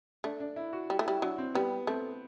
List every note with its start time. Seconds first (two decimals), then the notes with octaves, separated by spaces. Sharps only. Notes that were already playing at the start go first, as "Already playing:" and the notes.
0.24 A3 D4
0.40 D4
0.56 E4
0.73 F#4
0.90 G3
0.99 A3
1.06 G3 E4
1.22 F#3 D4
1.38 C4
1.55 G3 B3
1.87 A3 C4